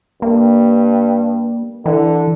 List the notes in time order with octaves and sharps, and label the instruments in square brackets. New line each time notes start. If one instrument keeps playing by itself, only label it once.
[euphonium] G2 [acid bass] A#3
[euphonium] D3 [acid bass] E3